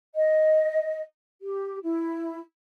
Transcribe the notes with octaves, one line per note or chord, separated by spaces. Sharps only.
D#5
G4
E4